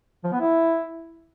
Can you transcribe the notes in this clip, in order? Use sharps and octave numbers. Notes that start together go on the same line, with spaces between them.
F3
B3
E4